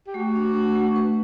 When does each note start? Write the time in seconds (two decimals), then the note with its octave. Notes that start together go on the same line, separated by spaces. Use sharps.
0.07 G4
0.14 A3 F#4
0.35 D4
0.56 A3
0.75 A3
0.96 B4